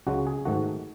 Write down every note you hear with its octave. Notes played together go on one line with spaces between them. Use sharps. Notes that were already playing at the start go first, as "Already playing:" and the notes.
C#2 C#3 G#3 F#4
G#4
G#2 D#3 A3 F#4